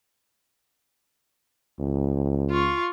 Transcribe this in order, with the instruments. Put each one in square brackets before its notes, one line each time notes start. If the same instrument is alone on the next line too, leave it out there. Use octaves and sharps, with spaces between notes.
[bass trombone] C#2
[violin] F4 C#6